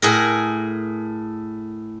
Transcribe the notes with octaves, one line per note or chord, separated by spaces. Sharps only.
A2 G#4 A#4